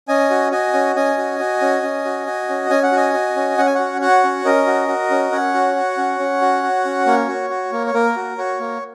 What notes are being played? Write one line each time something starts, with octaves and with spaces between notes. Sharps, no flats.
C#4 D#5 G#5
F#4
F#4 D#5 G#5
C#4
C#4 D#5 G#5
F#4
F#4
C#4
C#4
F#4
F#4
C#4
C#4 G#5
F#5
F#4 D#5 G#5
F#4
C#4
C#4 F#5
G#5
F#4 C#5 F#5
F#4 C#5 F#5
C#4
C#4 A#4 D#5
F#4
F#4
C#4
C#4 C#5 F#5
F#4
F#4
C#4
C#4
F#4
F#4
C#4
A#3 C#5
F#4
F#4
A#3
C#5
A#3 A#4
F#4
F#4 C#5
A#3